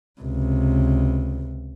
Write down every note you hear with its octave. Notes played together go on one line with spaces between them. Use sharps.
C#2 C3